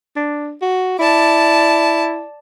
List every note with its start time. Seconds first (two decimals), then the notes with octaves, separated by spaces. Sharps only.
0.16 D4
0.62 F#4
0.99 E4 D5 A5